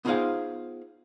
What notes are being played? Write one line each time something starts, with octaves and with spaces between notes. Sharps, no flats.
B3 D#4 F4 G#4 C5 F5